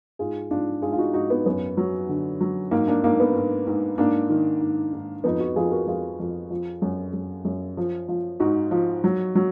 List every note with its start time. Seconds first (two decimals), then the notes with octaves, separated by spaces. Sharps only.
0.19 G#2 F4 G#4
0.51 G#2 D4 F4
0.82 G#2 F4 G#4
0.92 F4
0.98 D#4 F#4
1.13 G#2 D#4 F#4
1.30 B3 D#4
1.46 F#2 B3
1.77 F#3
2.09 D3
2.41 F#3
2.71 G#2 A#3
2.87 A#3 D4
3.04 G#2 A#3
3.20 B3
3.36 G#2
3.67 G#2
3.98 G#2 A#3 D4
4.30 D#3
4.61 G#2
4.93 G#2
5.24 F2 B3 D#4
5.40 D#4 F#4
5.56 F2 F4 G#4
5.71 F#4 A#4
5.87 F2 F4 G#4
6.20 F2
6.50 F3
6.82 F#2
7.13 F#2
7.45 F#2
7.77 F3
8.08 F3
8.40 G#2 D#4 F#4
8.71 F3
9.04 F#3
9.35 F#3